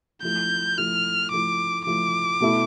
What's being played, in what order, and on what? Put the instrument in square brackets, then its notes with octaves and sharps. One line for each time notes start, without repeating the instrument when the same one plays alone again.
[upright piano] F3 A3 E4 [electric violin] G6
[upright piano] F3 A3 E4 [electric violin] F6
[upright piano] F3 A3 E4 [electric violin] D6
[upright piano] F3 A3 E4 [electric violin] D6
[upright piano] B2 A3 E4 A4